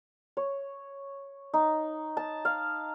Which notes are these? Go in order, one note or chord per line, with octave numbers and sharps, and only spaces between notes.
C#5
D#4
A5
F5